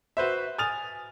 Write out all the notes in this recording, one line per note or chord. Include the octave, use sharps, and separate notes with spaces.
F#4 B4 C5 E5
G#5 D#6 F6 A6 F7